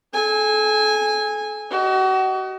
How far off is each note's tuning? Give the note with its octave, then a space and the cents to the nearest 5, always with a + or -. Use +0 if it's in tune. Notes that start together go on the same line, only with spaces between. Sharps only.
A4 -40 G#5 -15
F#4 +35 D#5 +0